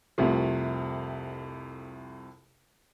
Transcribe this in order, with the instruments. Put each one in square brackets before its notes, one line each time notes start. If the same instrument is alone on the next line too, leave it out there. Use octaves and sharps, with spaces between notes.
[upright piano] C2 F2 C3 A3